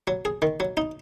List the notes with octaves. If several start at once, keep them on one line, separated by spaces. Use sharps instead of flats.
F#3
G#4
D#3
F#3
D#4